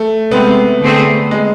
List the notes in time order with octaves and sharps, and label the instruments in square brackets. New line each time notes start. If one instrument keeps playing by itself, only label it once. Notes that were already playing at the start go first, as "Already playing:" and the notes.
Already playing: [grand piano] A3
[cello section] C3 G#3 C4 [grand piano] B3
[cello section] D3 A3 C4 G#4
[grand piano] G#3